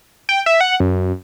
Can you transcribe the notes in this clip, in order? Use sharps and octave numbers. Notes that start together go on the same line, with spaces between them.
G5
E5
F#5
F#2